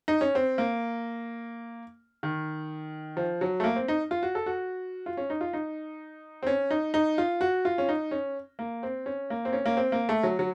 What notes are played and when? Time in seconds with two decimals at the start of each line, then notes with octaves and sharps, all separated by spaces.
0.08 D#4
0.21 C#4
0.35 C4
0.58 A#3
2.23 D#3
3.17 F3
3.41 F#3
3.60 A3
3.64 A#3
3.76 C4
3.88 D#4
4.11 F4
4.23 F#4
4.35 A4
4.46 F#4
5.06 F4
5.17 C#4
5.30 D#4
5.41 F4
5.53 D#4
6.43 C4
6.47 C#4
6.71 D#4
6.94 D#4
7.18 F4
7.41 F#4
7.65 F4
7.78 C#4
7.89 D#4
8.11 C#4
8.59 A#3
8.83 C4
9.06 C#4
9.30 A#3
9.45 C4
9.53 C#4
9.66 A#3
9.77 C4
9.92 A#3
10.09 A3
10.23 F#3
10.39 F#3